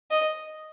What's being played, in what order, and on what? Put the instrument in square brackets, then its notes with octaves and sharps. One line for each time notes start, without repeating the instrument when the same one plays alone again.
[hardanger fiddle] D#5